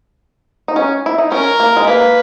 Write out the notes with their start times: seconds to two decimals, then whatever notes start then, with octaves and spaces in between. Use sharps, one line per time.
0.68 D#4
0.76 C#4
1.06 E4
1.18 D#4
1.32 C#4 A#4
1.60 A#3
1.77 G#3
1.86 A#3 B4